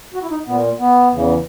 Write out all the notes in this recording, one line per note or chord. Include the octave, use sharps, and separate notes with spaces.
F#4
E4
D#4
A#2 B3
B3
E2 C#3 E3